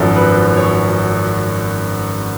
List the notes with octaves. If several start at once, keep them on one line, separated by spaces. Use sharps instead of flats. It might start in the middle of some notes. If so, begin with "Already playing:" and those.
Already playing: G#1 F#2 F3 A4
B4
C#5